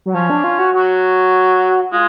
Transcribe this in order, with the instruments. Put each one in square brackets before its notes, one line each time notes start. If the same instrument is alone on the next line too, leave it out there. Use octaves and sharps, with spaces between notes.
[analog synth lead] F#3
[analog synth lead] F3 [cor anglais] C#4
[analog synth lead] D4
F4
F#4
[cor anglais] F#3 [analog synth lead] F#4
[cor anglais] G#3 [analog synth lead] F4